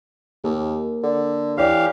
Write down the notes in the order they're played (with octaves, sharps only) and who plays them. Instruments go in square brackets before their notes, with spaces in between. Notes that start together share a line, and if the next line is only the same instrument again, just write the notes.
[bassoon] D#2 [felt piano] A#3
[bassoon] D3
[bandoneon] E3 G4 F5 [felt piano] C#5 D5